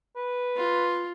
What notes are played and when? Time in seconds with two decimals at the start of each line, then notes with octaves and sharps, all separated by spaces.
0.17 B4
0.57 F4